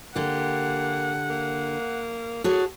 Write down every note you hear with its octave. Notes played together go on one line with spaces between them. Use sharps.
D3 A#3 G4 F#5
A#3
F#4 G#4 A4 C#5